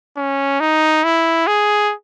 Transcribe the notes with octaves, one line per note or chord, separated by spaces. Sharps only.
C#4
D#4
E4
G#4